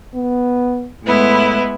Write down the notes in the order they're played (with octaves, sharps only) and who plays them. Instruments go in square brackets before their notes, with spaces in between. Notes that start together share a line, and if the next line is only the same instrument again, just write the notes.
[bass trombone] B3
[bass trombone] A2 [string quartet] G#3 B3 E4